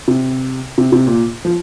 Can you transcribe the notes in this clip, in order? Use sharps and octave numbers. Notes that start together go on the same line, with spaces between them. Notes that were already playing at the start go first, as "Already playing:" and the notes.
C3
C3
C3
A#2
F3